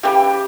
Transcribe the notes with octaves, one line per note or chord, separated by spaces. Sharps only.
C#3 E3 G3 G4